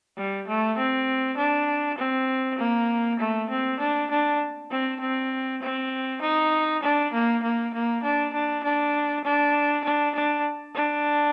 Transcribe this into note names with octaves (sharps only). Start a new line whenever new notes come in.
G3
A3
C4
D4
C4
A#3
A3
C4
D4
D4
C4
C4
C4
D#4
D4
A#3
A#3
A#3
D4
D4
D4
D4
D4
D4
D4